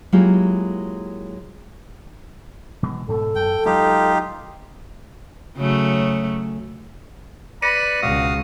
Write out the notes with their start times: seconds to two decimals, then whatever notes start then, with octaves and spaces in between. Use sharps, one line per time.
0.12 F#3 G#3 A#3 E4 F4 G4
2.83 B2 E3 G#3
3.08 G#2 B2 A4
3.35 F#2 G5
3.65 F#3 G#3 D#4 F4 G4
5.57 C#3 F#3 A3
7.62 B4 D5 B5 A#6 C#7 D#7
8.02 C#2 B2 F#4 F5 D#6